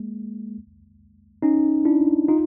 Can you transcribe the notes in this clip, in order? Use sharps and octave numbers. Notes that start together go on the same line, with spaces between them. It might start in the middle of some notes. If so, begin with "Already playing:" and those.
Already playing: G#3 A#3
C#4 D#4
D4 E4
D#4 F4